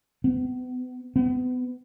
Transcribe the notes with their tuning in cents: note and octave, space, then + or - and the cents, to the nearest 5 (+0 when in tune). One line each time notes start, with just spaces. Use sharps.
B3 +35
B3 +30